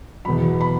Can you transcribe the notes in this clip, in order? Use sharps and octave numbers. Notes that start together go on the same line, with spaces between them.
E2 B2 F#3 B5
B5